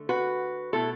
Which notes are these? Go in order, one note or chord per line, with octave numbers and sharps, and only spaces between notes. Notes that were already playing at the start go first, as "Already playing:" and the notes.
Already playing: D3 A3
F#4 B4
B2 A3 E4 A4